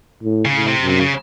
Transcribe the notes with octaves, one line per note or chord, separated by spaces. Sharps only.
A2
C#3
A2
C3
F#2
C3
C#3